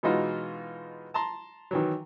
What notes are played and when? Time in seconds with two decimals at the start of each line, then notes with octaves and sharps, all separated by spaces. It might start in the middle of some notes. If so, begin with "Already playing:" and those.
0.03 B2 E3 G#3 D#4 F4 F#4
1.14 A5 A#5 C6
1.71 D#3 E3 F#3